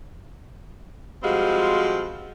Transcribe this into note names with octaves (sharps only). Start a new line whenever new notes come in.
F3 G3 G#3 C4 F#4 F5